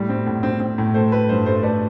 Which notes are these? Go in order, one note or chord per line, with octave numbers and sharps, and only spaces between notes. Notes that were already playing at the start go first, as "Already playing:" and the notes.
Already playing: A2 G3
C4
A2
C4
C4
A2
A3 C5
A3 B4
G2 C5
A3 C5
A3 B4 D5